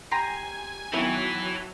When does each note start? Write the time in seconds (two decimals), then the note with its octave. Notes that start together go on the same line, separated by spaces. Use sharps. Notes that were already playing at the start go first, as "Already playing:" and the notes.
0.11 G4 G#5 A#5 C6
0.93 D#3 E3 F#3 B3 E4 A4 C#5 E5